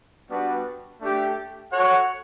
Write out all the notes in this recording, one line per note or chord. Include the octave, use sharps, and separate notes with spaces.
G3 B3 D4 F#4 B4
A3 D4 G4
F#4 A4 C#5 F#5